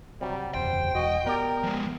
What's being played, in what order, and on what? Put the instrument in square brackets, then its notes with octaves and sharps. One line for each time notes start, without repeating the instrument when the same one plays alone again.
[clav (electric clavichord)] C3 F#3 [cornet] G3
[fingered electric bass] F#1 E2 [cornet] C5 [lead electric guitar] G5
[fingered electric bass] E1 [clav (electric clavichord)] F#4 [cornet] D#5
[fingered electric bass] B3 [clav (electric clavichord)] G4 D5 [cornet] A#4
[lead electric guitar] F3 G#3